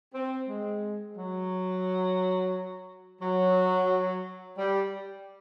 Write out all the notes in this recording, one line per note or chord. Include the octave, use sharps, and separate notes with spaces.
C4
G#3
F#3
F#3
G3